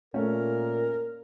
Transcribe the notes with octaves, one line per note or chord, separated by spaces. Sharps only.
A#2 A3 C#4 A#4